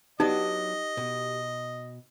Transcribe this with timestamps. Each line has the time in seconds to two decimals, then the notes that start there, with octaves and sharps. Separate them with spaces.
0.20 F#3 B3 D4 D#4 G4 D#5
0.97 B2